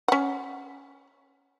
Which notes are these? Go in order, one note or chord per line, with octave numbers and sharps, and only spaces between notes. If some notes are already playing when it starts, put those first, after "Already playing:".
C#4 F#5